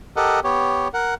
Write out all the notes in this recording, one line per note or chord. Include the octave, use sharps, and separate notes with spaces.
G4 A4 A#4 D#5 F#5
B3 G4 C#5
A#4 F#5